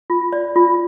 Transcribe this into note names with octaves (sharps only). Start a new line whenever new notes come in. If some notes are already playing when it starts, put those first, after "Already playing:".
F4
D5
F4